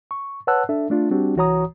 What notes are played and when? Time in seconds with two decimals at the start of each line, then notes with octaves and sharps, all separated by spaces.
0.11 C#6
0.47 B4 C#5 F#5 A5 E6 F#6
0.69 D4 A4 E5
0.90 A3 D4 F4
1.11 G3 C4 D4 F#4 G4
1.36 C2 E3 F#4 C#5 A#5 D#6